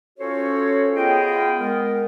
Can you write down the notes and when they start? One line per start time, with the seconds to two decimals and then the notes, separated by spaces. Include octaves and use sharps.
0.19 C#4 F4 F#4 A4 C5 C#5
0.95 B3 F4 G#4 D#5 G5
1.57 G#3 B3 A#4